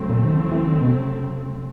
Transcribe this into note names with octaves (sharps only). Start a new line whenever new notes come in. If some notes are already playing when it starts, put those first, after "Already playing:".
Already playing: F2 C#3 F#3 A3 C4
A#2
D#3
E3
E3
D#3
B2
C3